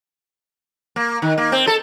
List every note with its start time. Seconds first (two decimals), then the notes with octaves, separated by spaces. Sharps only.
0.96 A#3
1.22 D#3
1.38 A#3
1.52 C4
1.67 A4